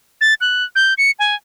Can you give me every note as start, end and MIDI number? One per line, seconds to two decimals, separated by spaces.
0.21 0.34 93
0.41 0.64 90
0.76 0.94 91
0.98 1.11 97
1.19 1.35 80